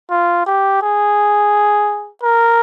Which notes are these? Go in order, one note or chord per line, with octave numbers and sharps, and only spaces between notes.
F4
G4
G#4
A#4